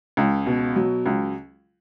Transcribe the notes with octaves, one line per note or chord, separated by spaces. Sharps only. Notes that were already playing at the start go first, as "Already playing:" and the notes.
C#2
B2
F#3
C#2